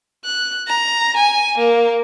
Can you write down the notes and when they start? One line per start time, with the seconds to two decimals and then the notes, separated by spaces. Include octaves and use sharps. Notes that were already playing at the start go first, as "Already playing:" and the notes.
0.25 F#6
0.68 A#5
1.17 G#5
1.58 A#3